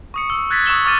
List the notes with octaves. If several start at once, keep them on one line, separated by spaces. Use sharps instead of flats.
C#6 D#6 C#7
E6
F#6 G#6 A6 B6
C#6 D#6 E6 E7 F#7 G7
C#6 D6 F6 A6 D#7 G7